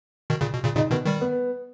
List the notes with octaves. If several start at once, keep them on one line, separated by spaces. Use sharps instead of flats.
B2 D#3
A#2 C#3
B2
A#2 C#3
A#2 C#3 D#4
B2 D#3 B3
D#3 G3
B3